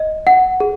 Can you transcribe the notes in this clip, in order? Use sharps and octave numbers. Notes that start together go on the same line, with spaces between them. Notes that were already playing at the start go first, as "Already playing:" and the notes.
Already playing: D#5
F#5
G#4